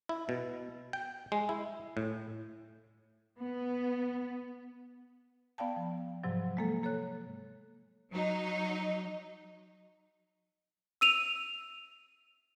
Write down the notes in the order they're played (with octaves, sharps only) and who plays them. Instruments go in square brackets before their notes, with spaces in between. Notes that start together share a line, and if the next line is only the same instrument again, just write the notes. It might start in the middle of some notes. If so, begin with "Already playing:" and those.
[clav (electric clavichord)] E4
B2
G5
G#3
E4
A2
[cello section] B3
[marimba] B3 D5 F5 G5 A5
F3
G#2 C3 F3 F#3
G#3 A#3 A4
A#3 A4 C#5 F#6
[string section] F#3 D#4
[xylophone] E6 D#7 F7